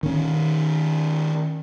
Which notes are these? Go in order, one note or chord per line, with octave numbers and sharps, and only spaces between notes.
D#3 C#4